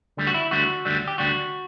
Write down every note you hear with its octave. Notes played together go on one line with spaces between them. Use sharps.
D2 D3 G3
F#4
E4
D2 D3 G3 F#4
D2 D3 G3
G4
D2 D3 G3 F#4